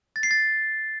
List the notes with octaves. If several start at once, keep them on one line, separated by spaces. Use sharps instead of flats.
A6
C7
A6